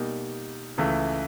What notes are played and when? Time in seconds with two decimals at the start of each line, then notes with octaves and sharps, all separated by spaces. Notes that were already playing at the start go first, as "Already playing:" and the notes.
Already playing: B2 G3 A#3 D#4
0.78 C#2 C#3 E3 A3